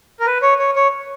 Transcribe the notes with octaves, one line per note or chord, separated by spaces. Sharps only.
A#4
B4
C#5
C#5
C#5